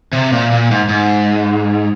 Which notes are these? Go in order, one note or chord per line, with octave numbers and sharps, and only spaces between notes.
C3
A#2
A#2
G#2
G#2